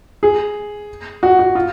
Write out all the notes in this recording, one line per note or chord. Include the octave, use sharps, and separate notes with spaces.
G#4
F#4
F#4
F4